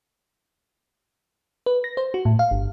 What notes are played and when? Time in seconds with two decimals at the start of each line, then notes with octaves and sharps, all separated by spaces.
1.66 B4
1.84 A#6
1.97 C5
2.14 F#4
2.25 A2
2.39 F5
2.51 G1